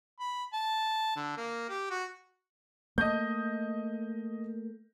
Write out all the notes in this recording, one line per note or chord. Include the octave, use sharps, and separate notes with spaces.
B5
A5
D3
A#3
G4
F#4
A3 A#3 D#5 G6